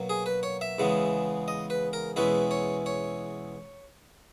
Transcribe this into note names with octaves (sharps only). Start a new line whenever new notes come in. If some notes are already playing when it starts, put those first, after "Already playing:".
Already playing: B2 F#3 A#3
G#4
B4
C#5
E5
E2 C#3 G#3 B3
D#5
B4
A#4
E2 B2 G#3 C#4 E4 B4
C#5
C#5